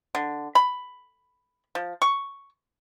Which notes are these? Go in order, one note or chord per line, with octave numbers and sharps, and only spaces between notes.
D3
B5
F3
C#6